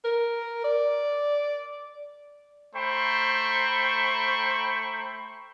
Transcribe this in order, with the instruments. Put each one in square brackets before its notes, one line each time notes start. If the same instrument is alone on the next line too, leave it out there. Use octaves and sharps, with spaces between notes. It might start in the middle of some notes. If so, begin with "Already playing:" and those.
[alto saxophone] A#4
D5
[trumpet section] A3 C5 G5 A#5 B5 C#6